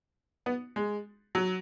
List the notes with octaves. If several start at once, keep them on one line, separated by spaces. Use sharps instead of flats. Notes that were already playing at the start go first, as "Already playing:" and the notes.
B3
G#3
F#3